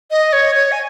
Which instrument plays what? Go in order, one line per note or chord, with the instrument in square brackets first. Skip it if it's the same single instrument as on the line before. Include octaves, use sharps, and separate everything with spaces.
[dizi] D#5
C#5
C#5
G#5